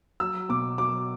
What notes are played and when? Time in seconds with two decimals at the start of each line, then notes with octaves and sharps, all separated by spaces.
0.20 F#3 E6
0.49 B2 D6
0.78 F#3 D6